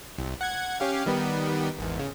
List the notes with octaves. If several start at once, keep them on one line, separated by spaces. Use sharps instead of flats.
C2
F#5 G#6
C#4 G4 F5
D#3 G3 B3
G#1 E2
C#3